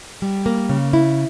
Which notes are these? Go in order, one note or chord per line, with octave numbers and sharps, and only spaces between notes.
G3
A#3
C#3
E4